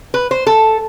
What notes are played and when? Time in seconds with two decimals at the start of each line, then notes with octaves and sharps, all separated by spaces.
0.14 B4
0.31 C5
0.47 A4